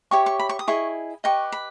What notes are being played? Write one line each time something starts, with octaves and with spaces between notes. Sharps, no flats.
E4 G4 C#5 C#6
C#6
B5
C#6
D#6
E4 G#4 D#5 C#6
G4 B4 D#5 C#6
B5